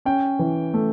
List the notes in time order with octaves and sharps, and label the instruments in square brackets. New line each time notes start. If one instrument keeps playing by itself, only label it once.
[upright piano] C#4 G5
E3
A3